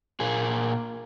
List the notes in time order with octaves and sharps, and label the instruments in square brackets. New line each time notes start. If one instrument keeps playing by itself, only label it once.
[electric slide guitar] A#2 G#4 [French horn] A#3